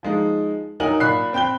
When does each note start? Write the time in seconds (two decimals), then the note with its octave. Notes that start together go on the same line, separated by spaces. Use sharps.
0.03 F3 G#3 D#4
0.80 F#3 D#4 A#4 G#5 F#7
1.00 A#2 B5 F#6 C7
1.33 C4 G5 B5 G6 G7